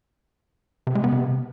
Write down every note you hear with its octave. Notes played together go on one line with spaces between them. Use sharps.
C3
G#3
B3
C3